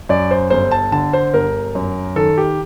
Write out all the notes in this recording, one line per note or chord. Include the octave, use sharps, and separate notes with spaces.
F#2 D5
C5
G1 C5
A5
D3 A5
C5
G1 A#4
F#2
D#3 A4
G4